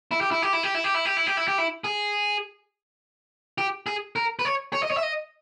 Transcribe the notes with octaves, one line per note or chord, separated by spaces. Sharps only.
E4
G4
E4
G4
E4
G4
E4
G4
E4
G4
E4
G4
E4
G4
E4
G#4
G4
G#4
A#4
B4
C#5
C#5
D#5
C#5
E5
D#5